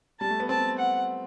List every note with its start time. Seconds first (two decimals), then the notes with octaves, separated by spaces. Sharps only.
0.20 G3 A5
0.30 A3
0.40 B3
0.49 C4 A5
0.78 F#5